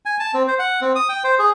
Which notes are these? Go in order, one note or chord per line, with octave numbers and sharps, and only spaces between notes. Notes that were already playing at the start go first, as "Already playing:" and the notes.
G#5
A5
C4
C5
F#5
C4
D#6
G5
C5
G#4